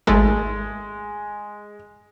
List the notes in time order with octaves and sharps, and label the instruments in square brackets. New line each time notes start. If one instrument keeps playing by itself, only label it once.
[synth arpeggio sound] G#1 A3 [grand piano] G#3